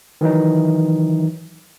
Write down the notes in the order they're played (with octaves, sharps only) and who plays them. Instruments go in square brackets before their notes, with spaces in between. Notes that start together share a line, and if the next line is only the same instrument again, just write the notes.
[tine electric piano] D#3 E3 F#3 D#4